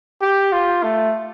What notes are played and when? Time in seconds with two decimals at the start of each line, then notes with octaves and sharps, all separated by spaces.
0.21 G4
0.52 F4
0.83 A3